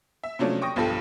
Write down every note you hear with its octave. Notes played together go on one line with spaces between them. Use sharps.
E5
C3 F3 F#3 A3 C#4 D4
G5 C#6 D#6 A#6
B1 G2 F3 F4 A4 G5